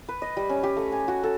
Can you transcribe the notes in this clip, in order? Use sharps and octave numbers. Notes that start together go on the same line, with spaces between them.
B4
D#5
G3
C#4
G4
A3
G#5
F#4
A4